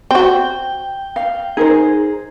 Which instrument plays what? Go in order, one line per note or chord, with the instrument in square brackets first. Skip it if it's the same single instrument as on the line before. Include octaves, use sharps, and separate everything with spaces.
[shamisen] C4 F#4 [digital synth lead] G5
[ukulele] F5
[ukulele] D#4 A#4 C5 [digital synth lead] G#4